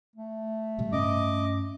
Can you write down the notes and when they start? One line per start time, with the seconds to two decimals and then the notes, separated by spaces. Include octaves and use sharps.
0.16 A3
0.78 A2 C3 G3
0.93 G2 C#4 D#5 D6